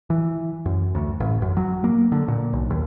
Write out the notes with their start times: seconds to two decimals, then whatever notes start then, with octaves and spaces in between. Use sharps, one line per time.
0.10 E3
0.66 F#2
0.95 D2
1.20 A1
1.42 F#2
1.57 F#3
1.84 A#3
2.12 D3
2.28 A#2
2.53 B1
2.70 D#2